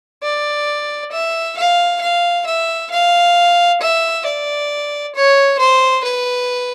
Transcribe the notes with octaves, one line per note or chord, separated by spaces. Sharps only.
D5
E5
F5
F5
E5
F5
E5
D5
C#5
C5
B4